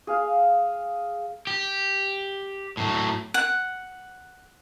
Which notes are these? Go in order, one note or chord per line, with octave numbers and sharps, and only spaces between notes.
G#4 F5
G4
A2 F#3
F#5